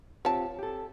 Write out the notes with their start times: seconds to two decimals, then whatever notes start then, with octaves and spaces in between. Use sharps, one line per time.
0.25 C4 F4 G4 C#5 A5
0.59 G4 A4